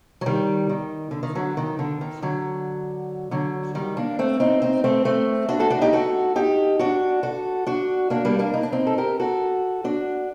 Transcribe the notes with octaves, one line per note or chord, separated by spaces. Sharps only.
F#3
D#3 G3
D#3
D3
D#3
D3 F#3
D#3
D3
D#3
D3 F#3
D3 F#3
D#3 G3
A#3 D4
A3 C4
C4 D#4
C4 D#4
A3 C4
A3 C4
D4 F#4
F#4 A4
D4 F#4
D#4 G4
F#4 A4
D#4 G4
D4 F#4
F#4 A4
D4 F#4
A#3 D4
G3 A#3
A#3 D4
D#4
D4
C4 D#4
A4
G4 A#4
F#4 A4
D4 F#4